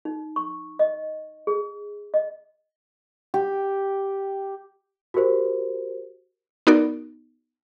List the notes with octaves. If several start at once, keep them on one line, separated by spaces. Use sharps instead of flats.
D#4
C#6
D#5
G#4
D#5
G4
F#4 G4 A#4 C5
B3 D#4 F#4 A#4 D5